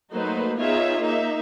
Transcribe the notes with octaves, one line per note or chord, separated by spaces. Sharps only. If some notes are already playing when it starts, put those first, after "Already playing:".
F#3 A3 A#3 D#4 B4 C5
B3 D#4 F4 G#4 C#5 E5
A#3 D#4 E5